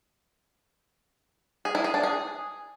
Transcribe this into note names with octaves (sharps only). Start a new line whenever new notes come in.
G#4
E4
G#4
D4
G#4